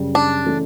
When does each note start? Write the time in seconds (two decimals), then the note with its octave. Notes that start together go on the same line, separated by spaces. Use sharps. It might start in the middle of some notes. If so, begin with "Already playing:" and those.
Already playing: F#2 C#3 G3
0.15 D4
0.45 C#3 E3 A3 C#4